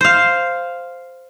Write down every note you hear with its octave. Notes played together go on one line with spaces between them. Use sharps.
C5 F5